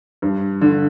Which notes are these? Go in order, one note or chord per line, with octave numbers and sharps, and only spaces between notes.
G2
D3